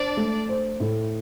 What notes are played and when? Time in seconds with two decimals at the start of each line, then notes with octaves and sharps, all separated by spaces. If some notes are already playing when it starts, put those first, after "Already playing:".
Already playing: D4 C5 D5
0.17 A3
0.49 C5
0.80 A2